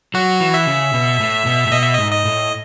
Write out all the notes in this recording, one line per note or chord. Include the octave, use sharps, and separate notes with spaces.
F#3 F#4
E3
E5
C#3
B2
A2
B2
A2
B2 D#5
E5
G#2 D#5
D#5
A2